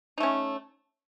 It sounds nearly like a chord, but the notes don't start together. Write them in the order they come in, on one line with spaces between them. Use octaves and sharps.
D#4 A3 C#4